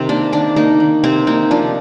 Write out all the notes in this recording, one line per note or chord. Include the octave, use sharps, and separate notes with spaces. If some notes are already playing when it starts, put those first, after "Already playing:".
Already playing: C3 D#3 C4
A#3 D4
D#3 D4
A#3 D#4
D#3
C3 C4
A#3 D#4
F3 D4